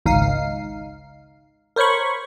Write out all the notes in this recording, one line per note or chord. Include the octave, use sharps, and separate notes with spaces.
G#1 C#2 D#4 F5 C7
A#4 C5 C#5 B5 C#6